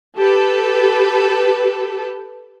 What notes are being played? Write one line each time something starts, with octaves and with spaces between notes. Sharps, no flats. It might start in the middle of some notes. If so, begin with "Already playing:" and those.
G4 A4 B4